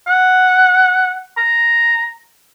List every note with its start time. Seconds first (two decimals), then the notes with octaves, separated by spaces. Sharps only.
0.07 F#5
1.37 A#5